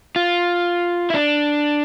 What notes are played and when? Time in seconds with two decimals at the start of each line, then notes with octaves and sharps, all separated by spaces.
0.16 F4
1.10 E4
1.14 D4